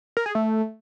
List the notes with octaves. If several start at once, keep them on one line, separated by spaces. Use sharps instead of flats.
A#4
G#4
A3